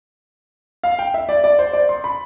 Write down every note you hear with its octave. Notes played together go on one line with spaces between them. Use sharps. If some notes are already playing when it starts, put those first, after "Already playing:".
F5
G5
E5
D5
D5
C5
D5
C6
B5